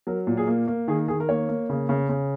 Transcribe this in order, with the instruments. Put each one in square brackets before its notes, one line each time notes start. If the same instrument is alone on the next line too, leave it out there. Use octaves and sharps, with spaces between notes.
[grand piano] F#3 A#4
A#2
G#4
A#3
A#3
D#3 G#4
D#3 G#4
A#4
A#3 C#5
A#3
C#3
C#3
C#3